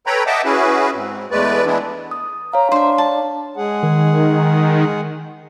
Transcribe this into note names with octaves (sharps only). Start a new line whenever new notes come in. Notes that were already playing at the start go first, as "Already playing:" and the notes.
A4 B4 C#5 G5 A#5 B5
D#5 E5 F#5 G5 A5 D6
C#4 E4 F#4 G#4 B4
G#2 C4
E2 G#3 A3 B4 D5
E3 G#3 B3 D4 E4
D#6
C#5 F5 A#5
D4 C5 E5
A5
G#3 G#4 F#5
D#3